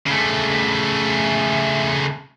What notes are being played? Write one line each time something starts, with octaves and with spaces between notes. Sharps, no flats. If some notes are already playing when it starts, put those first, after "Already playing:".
C#3 A3